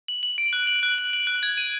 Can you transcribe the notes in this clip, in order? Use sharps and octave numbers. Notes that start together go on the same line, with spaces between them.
F#7
F#7
D7
F#6
F#7
F#6
F#7
F#7
F#6
G#6
D#7